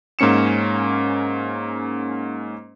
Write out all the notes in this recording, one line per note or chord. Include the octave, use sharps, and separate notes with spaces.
G#2 A#3 C#4 C#7 E7